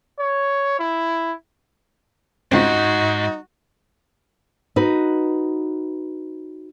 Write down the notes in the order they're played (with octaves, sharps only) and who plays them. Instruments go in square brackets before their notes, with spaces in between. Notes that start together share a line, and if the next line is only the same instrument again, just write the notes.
[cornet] C#5
E4
[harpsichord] C#2 C4 [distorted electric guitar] G#2 [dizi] D#4 [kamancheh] F#4
[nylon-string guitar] D#4 F#4 B4